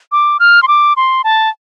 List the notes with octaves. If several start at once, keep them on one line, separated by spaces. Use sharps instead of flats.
D6
F6
C6
D6
C6
A5